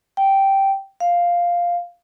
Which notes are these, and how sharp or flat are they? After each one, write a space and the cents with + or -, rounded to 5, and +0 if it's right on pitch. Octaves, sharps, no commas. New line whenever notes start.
G5 -10
F5 +0